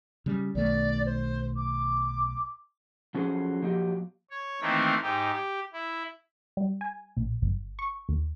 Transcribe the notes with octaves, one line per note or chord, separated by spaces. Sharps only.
C#3 G3
B1 D#3 A3 D5
C5
D6
F3 F#3 C#4 G#4 A4 C5
F3 F#3 A#3 G4 D#5
C#5
D#3 E3 A3 A#3 C4
G#2 D#4 G4
G4
E4
G3
G#5
A#1
G1
C#6
D#2